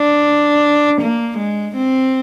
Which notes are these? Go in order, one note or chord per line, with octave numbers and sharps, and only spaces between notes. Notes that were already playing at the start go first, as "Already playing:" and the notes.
Already playing: D4
A#3
G#3
C4